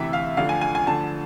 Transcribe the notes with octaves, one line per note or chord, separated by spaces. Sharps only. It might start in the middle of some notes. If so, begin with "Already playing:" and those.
Already playing: D2 C3 E3 E5
F5
D2 D3 F3 F5
G#5
G#5
G#5
D2 D3 F3 A5